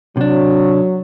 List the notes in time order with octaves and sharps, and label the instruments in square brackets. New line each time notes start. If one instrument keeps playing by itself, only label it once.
[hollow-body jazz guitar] C3 D4 [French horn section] F#3